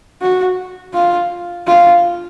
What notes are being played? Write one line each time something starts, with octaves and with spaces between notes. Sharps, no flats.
F#4
F4
F4